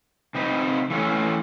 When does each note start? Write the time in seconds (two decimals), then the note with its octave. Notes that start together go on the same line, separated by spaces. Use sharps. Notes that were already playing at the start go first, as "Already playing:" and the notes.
0.35 C3 D#4 B4
0.90 E3 A3 C#4